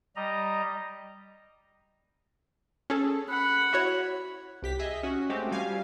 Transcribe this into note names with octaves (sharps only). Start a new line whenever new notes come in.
G3 D#5 A#5
C#4 G#4 A4
F#5 B5
E4 F#4 C#5
C2 G4 B6
G#4 D#5 E5
C#4 F#4
G#3 A3 C4 F#4 G4
F3 G3 F5 G#5